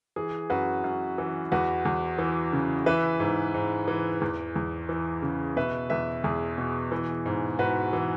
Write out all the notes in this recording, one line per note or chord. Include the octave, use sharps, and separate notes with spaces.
E3 G#4
F#2 F#4 B4
F#2
E3
E2 F#4 B4
E2
E3
C#3
E3 B4 E5
G#2
G#2
E3
E2
E2
E3
C#3
B2 B4 E5
E2 B4 E5
E2 G#4
B2
E3
G#2
G#2 F#4 B4
E3